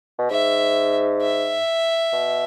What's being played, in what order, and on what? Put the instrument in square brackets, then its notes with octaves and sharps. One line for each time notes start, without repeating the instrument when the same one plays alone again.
[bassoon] B2
[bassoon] G#2 [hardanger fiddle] E5
[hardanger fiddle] E5
[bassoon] B2